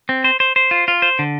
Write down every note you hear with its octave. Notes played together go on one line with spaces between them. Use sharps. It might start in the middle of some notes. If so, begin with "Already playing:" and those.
C4
C5
C5
C5
F4
F4
C5
D3